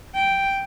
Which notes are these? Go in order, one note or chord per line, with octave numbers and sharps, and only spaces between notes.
G5